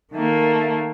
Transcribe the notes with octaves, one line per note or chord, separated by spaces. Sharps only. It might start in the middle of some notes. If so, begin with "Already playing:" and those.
D#3 A3 A#3